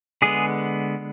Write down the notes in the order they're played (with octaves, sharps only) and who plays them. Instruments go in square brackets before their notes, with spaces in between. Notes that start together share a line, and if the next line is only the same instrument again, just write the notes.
[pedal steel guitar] D3 G#3 B3 G#4